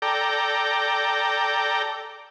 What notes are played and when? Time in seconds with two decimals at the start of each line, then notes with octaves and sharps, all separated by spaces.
0.02 A4 D5 G5 A#5